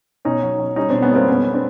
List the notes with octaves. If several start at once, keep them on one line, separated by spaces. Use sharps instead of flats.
B2 C#4 D#4
F#3
F#3
G3 C#4 D#4
B2 C4 D4
B3 C#4
G3 A#3 C4
F2 B3 C#4
C4 D4